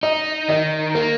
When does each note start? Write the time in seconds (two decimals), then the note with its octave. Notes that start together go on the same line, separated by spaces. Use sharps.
0.03 D#4 D#5
0.49 D#3 D#5
0.95 A#3 A#4